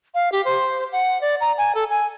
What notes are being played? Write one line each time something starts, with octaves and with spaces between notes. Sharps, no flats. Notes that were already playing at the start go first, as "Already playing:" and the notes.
F5
G4
C5
F#5
D5
A#5
G#5
A4
G#5